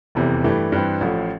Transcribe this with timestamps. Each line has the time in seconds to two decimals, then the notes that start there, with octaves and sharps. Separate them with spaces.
0.15 F1 E2 C3 E3
0.44 G2 E3 A3 E4 G4
0.72 G2 E3 G3 C4
1.01 A1 A2 F3